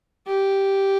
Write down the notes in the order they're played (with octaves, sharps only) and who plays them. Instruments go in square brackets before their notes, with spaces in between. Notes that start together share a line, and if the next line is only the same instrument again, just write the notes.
[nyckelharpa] G4